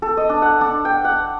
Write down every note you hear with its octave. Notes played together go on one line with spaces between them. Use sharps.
A4
D#5
D4
F#5
D4
G5
F#5